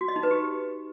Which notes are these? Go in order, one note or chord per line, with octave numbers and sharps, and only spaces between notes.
F#4
D#5
D#4
B4
G4